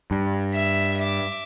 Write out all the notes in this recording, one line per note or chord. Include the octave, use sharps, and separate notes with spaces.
G2
E5
E5 D6